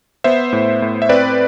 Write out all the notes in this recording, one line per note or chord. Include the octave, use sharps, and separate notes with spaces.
B3 C5 E5
A2
A2
E5
C4 B4 D5